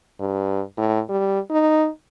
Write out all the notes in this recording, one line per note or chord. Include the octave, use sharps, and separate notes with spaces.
G2
A2
G3
D#4